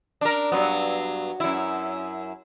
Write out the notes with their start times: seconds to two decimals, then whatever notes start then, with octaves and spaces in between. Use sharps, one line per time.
0.21 D4 A#4
0.52 G2 F#3 B3
1.40 F#2 E4